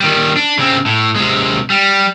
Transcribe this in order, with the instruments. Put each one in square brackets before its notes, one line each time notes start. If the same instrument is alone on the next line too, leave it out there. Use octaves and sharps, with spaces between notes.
[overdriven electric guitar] D#3 G3
D4
C#3 C4
A2
C3 G#3
G3